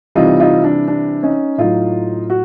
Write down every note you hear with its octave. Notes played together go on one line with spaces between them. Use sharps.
C3 E3 G3 D#4 F4
D#4 F4
D4
D4
C#4 D#4
A2 F#3 D#4 F4
F#4